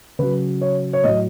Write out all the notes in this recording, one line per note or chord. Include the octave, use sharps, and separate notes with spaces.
C#3 F#3 B4
C#5
C#5
A2 F#3 D#5